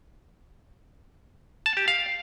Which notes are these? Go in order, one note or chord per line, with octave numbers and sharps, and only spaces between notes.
A5
G4
F5